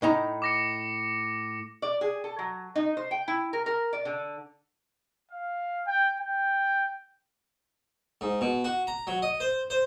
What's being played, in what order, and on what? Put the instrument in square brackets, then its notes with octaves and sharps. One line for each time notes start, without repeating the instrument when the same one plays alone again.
[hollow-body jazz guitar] A2 D#4 A#5
[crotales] D6 A#6 C#7
[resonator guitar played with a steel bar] D5
G#4
A4
F#3
D#4
C5
G5
E4
A#4
A#4
D5
D3
[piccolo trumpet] F5
G5
G5
[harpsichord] G#2
B2
F#4
A#5
F#3
D#5
C5
C5